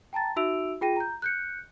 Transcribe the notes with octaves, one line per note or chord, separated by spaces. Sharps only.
G5 A5 A#5 A6
D#4 F#4 E5 E6 D7 F7
F4 G#4 G5 A#6 D#7
A#5 G6
F#6 G6 C#7